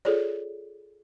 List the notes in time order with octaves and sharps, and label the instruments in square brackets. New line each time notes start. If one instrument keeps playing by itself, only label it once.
[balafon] F4 G#4 A4 C#5 D5